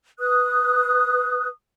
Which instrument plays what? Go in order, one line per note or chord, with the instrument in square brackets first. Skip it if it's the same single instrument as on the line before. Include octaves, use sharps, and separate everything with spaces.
[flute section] B4 D#6 F#6